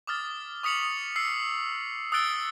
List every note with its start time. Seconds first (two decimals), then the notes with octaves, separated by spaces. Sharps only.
0.07 D6 D#6 F6 A6
0.63 C#6 D#6 B6 C#7 F7 F#7
1.16 E6 C7
2.12 D#6 E6 F#6 A6 D7 G7